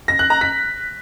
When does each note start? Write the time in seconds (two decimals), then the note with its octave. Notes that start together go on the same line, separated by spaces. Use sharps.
0.08 A#6
0.19 F#6
0.30 A#5
0.41 B6